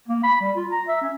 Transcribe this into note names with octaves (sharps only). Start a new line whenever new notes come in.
A#3
B5
G3
F4
A#5
E5
C#4